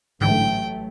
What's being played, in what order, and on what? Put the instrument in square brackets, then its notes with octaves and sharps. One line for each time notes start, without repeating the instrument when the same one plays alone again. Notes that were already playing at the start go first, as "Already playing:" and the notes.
[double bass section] A1 F#3 A3 [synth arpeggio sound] G#2 D3 E3 [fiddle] G5